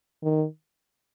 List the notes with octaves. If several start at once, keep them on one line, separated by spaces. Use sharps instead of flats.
D#3